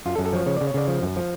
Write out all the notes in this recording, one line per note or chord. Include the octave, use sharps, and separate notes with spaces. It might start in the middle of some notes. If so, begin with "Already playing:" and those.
F#2 F4
A4
F#2
A4
F3 C#5
C#3 C#5
C#3 D5
C#5
C#3 D5
F3
F#2
F3